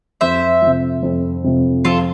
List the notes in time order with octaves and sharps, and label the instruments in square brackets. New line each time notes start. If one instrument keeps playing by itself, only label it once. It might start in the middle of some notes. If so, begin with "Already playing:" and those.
[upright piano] F2 [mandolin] C5 E5
[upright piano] C3 F3
F2
C3 F3
[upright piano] F2 [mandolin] F4 A4